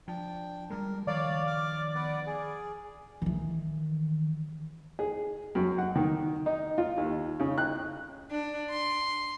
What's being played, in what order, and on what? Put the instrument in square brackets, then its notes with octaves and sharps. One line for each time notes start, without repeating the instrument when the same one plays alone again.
[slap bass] F3 [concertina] D4 G5
[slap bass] G3 G#3 [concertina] A#4
[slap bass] D#3 F3 [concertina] C#5 F5 [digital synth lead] D5
[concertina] D6 F6
B3 B4 F#5
G#4
[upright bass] D#3 E3
[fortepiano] G#4
F#2
F#5
D#3
D#4
F4
D#2
C#3
F#6
[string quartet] D4
C6